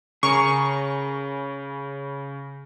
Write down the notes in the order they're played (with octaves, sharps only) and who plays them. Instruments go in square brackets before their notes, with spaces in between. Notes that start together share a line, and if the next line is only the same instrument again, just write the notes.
[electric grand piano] C#3 [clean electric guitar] G#4 A#4 C#5 [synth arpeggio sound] C#6